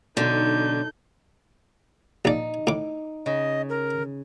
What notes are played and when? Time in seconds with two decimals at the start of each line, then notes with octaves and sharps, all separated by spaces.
0.17 B1 D3 D#4 G6
2.25 A#1 D#4 D5
2.67 A2 D6
3.26 C#3 D#5
3.69 A#4